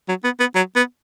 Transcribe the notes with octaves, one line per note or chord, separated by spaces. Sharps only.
F#3
B3
B3
F#3
B3